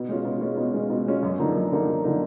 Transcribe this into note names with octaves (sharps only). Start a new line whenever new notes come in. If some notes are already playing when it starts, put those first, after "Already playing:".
Already playing: B2
G#3 C#4 F4
B2
G#3 C#4 F4
B2
G#3 C#4 F4
B2
G#3 C#4 F4
F#2
D3 F3 A#3 D#4
F#2
D3 F3 A#3 D#4
F#2
D3 F3 A#3 D#4